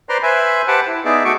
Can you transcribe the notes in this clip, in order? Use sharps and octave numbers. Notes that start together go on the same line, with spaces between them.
B4 C5 D5 A#5 C6
B4 C5 E5 G#5
G4 B4 C5 F#5 G5 A5
E4
B3 D#4 G#4 D5 E5
A3 F#4 C#6 D6